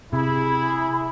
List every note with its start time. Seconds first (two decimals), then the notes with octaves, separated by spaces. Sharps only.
0.13 C3 E4 G#4 B5